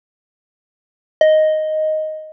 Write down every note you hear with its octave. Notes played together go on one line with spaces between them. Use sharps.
D#5